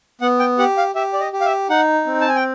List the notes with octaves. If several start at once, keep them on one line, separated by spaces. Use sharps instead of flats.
B3 F#5
G5
G4 F#5
F5
G4 E5
D5
D#5
G4
F5
E5
D#4 F#5
C4
A5
G#5
G5